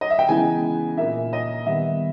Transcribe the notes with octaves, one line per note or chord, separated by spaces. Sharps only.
D#5
E5
G5
C#3 E3 G#3 B3 D#4 G#5
A#2 A#3 D#4 E5
D#5
D#3 G3 B3 E5